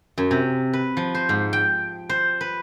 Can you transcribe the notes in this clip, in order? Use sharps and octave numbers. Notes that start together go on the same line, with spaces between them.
F#2
C3
B4
F3
C5
G#2
G5
C5
B4